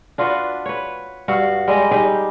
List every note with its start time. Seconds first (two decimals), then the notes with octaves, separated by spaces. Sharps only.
0.18 D4 F4 F#4 B4
0.66 B4 C#5
1.28 G2 F#4 F5 F#5
1.68 G3 G#3 D#5
1.91 G3 D#4 G4 G#4